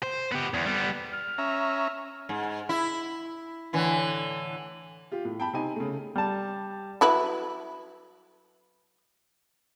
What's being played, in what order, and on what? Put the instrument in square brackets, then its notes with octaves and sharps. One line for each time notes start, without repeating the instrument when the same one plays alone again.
[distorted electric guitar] C5
B3 G4
E2
G3 B3
[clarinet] F6
[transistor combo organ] C#4 E5 A#5
[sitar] G#2
E4
A2 D3 E3
[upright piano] F4 G4
A2
G5 A5 B5
C3 C4 D#4 G#5 D#7
C#3 A3
[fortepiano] G3 A5
[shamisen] F#3 E4 B4